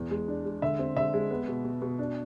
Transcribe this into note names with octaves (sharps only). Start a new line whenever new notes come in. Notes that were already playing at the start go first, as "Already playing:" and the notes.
Already playing: E2
G#3
D4
G#3
D3 E5
C4
D3 E5
G#3
B3
B2
B2
B2
D4